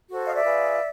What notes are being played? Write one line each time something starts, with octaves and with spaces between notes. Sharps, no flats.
F#4 A4 C5
D#5 F5
D5 E5
F4 G#4 B4